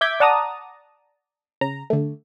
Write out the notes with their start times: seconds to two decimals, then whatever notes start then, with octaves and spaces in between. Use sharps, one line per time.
0.01 E5 D6 G6 G#6 B6
0.20 D5 F#5 A5 A#5 D#6
1.61 C#3 A#5
1.90 D3 A3